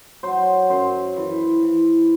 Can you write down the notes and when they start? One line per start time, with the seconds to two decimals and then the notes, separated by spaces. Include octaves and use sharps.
0.23 F#3 C5
0.69 F#2 C5
1.16 E3
1.63 E3